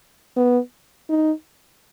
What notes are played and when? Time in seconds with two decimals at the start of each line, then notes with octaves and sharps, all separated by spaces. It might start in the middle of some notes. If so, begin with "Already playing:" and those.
0.36 B3
1.10 D#4